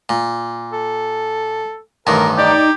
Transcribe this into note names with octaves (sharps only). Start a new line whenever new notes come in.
A#2
A4
A1 G2 D#3 A#4
D#4 G4 D5